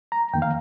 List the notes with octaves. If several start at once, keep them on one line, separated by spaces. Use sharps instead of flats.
A#5
F2 D#3 A#3 G5
F5